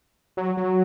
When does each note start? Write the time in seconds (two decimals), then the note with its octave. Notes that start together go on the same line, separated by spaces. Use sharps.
0.37 F#3
0.57 F#3